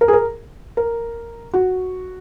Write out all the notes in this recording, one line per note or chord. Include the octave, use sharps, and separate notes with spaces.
A#4
G#4
A#4
A#4
F#4